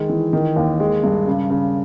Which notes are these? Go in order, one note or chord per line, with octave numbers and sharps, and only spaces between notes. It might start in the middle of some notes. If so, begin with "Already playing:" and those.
Already playing: D#3 G#3
E3
D#3
D#2
G#3
G2
C#3
C#3